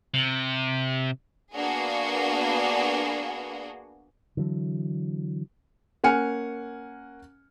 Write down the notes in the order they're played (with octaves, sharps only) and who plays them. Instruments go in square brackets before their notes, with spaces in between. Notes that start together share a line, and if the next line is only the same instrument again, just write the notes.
[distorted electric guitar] C3
[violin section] A#3 B3 D4 F#4 G#4
[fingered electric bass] D3 E3 F#3
[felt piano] A#3 C#4 F#5 G#5 F6 C#7